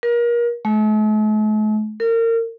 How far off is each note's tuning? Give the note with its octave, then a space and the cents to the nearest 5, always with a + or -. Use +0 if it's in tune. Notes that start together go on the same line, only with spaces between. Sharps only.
A#4 +30
A3 -45
A#4 -30